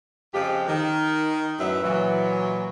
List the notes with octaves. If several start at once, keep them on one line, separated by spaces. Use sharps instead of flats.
F2 C#3 F3 G#3 G4
D#3
F#2 A2 F#3 B4 D#5 E5
A#2 E3 F#3